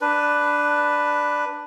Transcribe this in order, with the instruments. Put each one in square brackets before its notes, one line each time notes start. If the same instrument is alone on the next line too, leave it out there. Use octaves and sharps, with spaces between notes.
[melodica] D4 B4